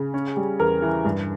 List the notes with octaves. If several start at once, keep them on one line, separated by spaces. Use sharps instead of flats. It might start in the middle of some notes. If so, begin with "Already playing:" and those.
Already playing: C#3
C#4
G3
E2 A#4
E3
G2